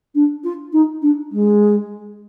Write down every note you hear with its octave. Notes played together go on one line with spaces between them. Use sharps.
D4
F4
D#4
D4
G#3